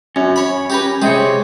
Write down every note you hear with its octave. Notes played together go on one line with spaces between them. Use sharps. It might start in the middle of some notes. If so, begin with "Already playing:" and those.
F#2 C#4
C#5 B5
G4 A#4 B4
C3 G#3 G4 G#4 C#5